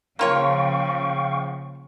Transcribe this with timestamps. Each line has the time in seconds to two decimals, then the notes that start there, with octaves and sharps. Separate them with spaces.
0.19 C#3 F3 A#3 F4 C#5 F5 G5 C#6